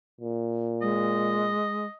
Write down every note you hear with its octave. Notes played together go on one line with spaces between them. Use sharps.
A#2
G#3 D#5